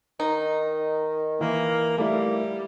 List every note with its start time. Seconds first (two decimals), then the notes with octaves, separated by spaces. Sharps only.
0.20 D#3 D#4
1.41 E3 A#3
1.98 G3 A3 A#3 E4